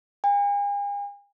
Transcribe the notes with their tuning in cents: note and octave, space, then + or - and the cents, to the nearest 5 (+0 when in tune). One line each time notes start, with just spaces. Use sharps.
G#5 -45